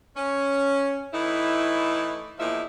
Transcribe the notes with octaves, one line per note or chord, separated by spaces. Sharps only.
C#4
A2 E3 A3 D#4 E4
E2 A#2 F3 D#4 E4 E5